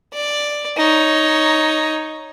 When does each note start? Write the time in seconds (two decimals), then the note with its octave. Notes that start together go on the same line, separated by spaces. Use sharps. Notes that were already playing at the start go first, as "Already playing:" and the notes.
0.13 D5
0.77 D#4 C#5